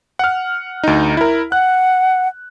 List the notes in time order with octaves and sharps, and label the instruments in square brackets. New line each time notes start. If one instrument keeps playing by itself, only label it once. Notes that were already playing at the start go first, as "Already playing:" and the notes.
[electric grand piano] F#5 F6
D2 D#4
E4 A#4
[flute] F#5 [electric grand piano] F#6